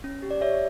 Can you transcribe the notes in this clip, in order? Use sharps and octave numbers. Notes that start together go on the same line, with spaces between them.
C#4
G4
D5
G4 C#5 E5